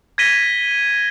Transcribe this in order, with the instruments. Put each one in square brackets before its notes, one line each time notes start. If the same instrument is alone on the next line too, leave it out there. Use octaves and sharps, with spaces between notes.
[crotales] G#6 A#6 B6 D#7 G7